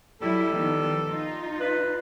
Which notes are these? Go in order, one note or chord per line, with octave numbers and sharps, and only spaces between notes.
F#3 G3 E4 A4
D#3 F3 B3
D#4 F4
B4